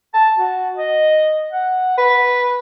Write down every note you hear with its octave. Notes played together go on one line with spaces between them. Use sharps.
A5
F#4
D#5
F#5
B4